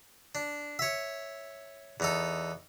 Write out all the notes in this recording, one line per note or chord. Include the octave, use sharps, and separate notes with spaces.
D4
C#5 E5
E2 D#4 A4